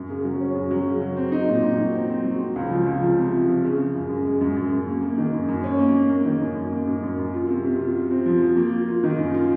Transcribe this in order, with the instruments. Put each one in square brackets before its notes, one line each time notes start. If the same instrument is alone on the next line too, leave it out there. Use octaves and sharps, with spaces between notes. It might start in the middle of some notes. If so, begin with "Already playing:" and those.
Already playing: [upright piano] F#2
C#3
F#3
C#4
F#2
F#3
C#3
F#3
C4
D#4
A#2
D#4
F#3
C4
C4
F#3
C4
C#2
F3
C#2
F3
C3
C3
F3
C#3
C#3
F#2
F#2
G#3
F#2
F#2
F#2
A#3
A#3
D#3
F#2
F#2
C#4
A#3
A#3
A#3
D#3
F#2
F#2
A#3
F#2
F#2
F#2
F4
C3
C3
F4
F4
C4
F3
F4
A#3
F4
F4
D#3
F#2
F4